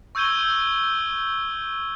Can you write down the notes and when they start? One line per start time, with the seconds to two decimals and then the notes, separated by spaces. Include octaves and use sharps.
0.15 C#6 E6 G6 G#6 D#7 G7